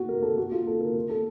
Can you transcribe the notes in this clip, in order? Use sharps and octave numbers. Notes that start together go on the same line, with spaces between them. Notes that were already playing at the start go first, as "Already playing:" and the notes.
Already playing: F#4
A#4
A4
F#4
F4
A4
A#4
A#4
A4